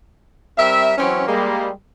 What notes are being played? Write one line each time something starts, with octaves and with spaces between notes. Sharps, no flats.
G3 C4 A#4 E5
E3 F#3 C4 C#4
G3 G#3 A#3